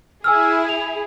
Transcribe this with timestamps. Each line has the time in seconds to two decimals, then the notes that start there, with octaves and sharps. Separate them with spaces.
0.24 E4 G#4 G#5 E6 F6
0.69 F7